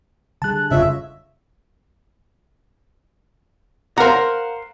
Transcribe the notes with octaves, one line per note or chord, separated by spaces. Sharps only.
D3 G3 G#4 A5 F#6
F1 C#3 F4 C#5 D#5 E5
A#4 C5 F5 F#5 A#5